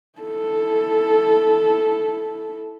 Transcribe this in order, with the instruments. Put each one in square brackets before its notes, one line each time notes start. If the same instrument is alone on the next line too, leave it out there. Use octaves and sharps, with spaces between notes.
[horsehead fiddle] E4 A4